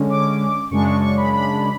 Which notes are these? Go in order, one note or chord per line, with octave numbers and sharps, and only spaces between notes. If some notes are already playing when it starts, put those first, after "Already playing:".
Already playing: D3 G#3 C#4
D6
F#2 C#3 G#3 D4 C#6
C#6
C#6
B5
B5